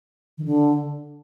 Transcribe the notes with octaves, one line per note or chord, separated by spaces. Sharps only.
D#3
D3